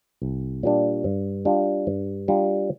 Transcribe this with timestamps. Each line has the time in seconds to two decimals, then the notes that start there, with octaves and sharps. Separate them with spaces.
0.22 C2
0.63 A#2 G3 D4
1.04 G2
1.45 G3 D4 F4
1.87 G2
2.28 G3 D4 F4